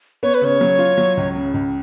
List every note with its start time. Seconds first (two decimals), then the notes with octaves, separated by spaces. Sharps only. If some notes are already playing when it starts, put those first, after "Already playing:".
0.23 B3 C#5
0.34 B4
0.42 C#3 C#5
0.61 F#3
0.79 F4
0.98 F#3
1.17 C#2
1.35 C#3
1.54 C#2